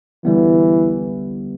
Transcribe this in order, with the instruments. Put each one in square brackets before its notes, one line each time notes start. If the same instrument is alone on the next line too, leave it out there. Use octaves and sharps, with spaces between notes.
[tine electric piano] D3 G3 B3 [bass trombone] E3